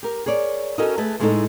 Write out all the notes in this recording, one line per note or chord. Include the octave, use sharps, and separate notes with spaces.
G4 A#4
G#4 A#4 C#5 D5
C#4 D#4 F#4 A4 A#4 D#5
A3 G#4 B4 A5
A2 G#3 A3 B3 D#4 A4